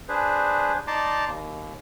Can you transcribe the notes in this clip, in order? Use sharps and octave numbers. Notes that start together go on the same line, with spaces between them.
D4 G#4 B4 C5
D#4 D5 A5 A#5 C6 D6
D#2